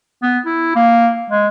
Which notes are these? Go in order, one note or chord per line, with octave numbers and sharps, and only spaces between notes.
B3
E4
A#3
G#3